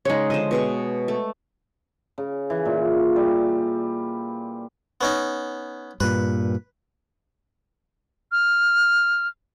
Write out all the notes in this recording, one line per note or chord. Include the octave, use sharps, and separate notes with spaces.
C#3 G#3 D#4 C#5
D3 F3 C5 D#5
B2 G#4 C#6
A3
C#3
E3
A#2
G3
B3 C#4 D#4
G2 A#2 B4
F6